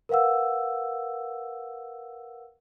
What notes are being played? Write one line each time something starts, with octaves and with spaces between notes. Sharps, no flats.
A#4 B4 F5 F#5 E6